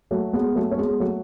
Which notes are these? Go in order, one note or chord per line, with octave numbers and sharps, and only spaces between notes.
F#3 A3
G#3 B3
F#3 A3
C#4
G#3 B3
F#3 A3